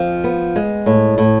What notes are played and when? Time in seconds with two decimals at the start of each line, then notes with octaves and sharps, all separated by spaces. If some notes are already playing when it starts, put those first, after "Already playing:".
Already playing: F2 F3
0.24 B3
0.56 G#3
0.86 A2
1.18 A2